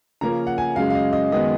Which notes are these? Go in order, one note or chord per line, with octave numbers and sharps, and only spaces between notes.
C#3 F3 A#3 C#4 A#5
F#5
G#5
F#2 C#3 G#3 F5
F5
D#5
D#5
F#2 D#3 G#3 B3 D#5